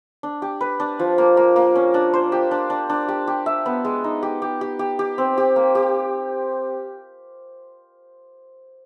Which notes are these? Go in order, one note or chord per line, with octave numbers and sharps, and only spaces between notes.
D4
G4
B4
D4
F3
A#3
A#3
A#3
C#4
D4
C5
G4
D4
D4
D4
G4
G4
E5
B3
G#3
D#4
G4
G4
G4
G4
G4
C4
G4
A#3
G4